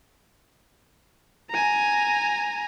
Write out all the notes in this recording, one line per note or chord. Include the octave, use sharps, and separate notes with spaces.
G#5 A#5